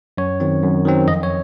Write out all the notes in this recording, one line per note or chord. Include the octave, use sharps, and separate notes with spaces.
F#2 C#5
D#3 F#3 C4
F#2
D#3 F#3 C4
F2 D#5
C#5